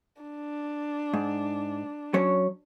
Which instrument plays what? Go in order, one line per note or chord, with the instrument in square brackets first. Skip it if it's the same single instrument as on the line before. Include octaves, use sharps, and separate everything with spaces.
[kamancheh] D4
[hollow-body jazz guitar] G#2
F#3 C#4 C#5